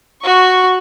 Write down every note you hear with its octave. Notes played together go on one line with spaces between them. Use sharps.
F#4 C#6